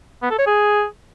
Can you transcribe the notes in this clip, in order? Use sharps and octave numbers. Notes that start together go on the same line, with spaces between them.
B3
A4
C#5
G#4